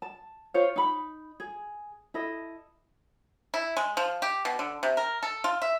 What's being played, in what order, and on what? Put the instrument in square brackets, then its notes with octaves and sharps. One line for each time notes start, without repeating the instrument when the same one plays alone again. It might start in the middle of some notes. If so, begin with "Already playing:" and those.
[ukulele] A5
F4 C5 C#5 F5
D#4 B5
G#4
E4 A4 D#5
[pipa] E4
G#3
F3
G4
B2
D3
C3
A#4
A4
F4
E5